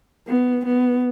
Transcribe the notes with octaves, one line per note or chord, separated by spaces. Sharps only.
B3
B3